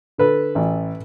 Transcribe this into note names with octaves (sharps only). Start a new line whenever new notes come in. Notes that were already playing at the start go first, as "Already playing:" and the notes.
D3 A4 B4
A1